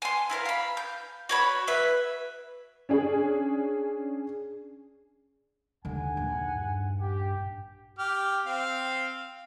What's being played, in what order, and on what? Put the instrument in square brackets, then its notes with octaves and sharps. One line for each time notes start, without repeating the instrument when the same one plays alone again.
[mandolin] G#5 C6
E4 A#4 C5 F5
F5 B5
G6
F#4 C#5 B5
B4 E5
[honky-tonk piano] C#4 D4 G#4
[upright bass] D#2 D3 [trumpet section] F#5 G#5
[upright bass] A#1 D#2
[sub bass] G2
[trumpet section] G4
[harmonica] G4 F6
C4 F5